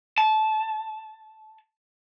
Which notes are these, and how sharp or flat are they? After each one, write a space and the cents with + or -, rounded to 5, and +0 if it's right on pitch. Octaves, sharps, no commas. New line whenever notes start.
A5 -20